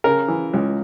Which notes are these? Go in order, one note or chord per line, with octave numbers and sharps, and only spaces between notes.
C#3 A#4
E3
C#2